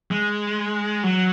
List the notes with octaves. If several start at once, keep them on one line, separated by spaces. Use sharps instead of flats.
G#3
F#3